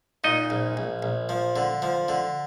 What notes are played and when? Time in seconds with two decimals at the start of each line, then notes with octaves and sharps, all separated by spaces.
0.24 A#2 D#4 D#5
0.50 A#1
0.77 A#1
1.03 A#1
1.29 F3
1.56 D3
1.82 F3
2.08 D3